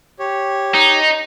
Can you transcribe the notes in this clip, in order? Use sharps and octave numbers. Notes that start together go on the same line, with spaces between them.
G4 C#5
D#4